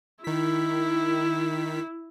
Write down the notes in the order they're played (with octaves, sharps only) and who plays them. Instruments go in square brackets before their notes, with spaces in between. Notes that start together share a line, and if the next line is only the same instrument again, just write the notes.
[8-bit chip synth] D#3 B6 [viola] E4